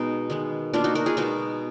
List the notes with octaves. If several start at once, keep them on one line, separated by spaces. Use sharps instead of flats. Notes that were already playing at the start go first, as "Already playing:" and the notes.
Already playing: B2 G#3 B3 D#4
D#3 G#3 B3
B2 A#3 D4 F4
D#4 F#4
F#4 A#4
F4 G#4
B2 G#3 B3 D#4 F#4